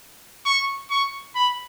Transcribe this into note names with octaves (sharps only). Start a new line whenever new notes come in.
C#6
C#6
B5